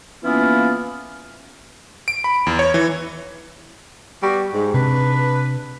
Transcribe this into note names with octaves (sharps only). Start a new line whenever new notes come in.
E3 A#3 B3 C#4 E4 F4
D7
B5
E2
C#5
E3
G3 B3 F#4
G#2
C3 D4 B4